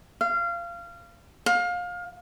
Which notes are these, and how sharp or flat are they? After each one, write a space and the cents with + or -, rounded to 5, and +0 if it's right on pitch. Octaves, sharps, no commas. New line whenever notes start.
F5 -25
F5 +25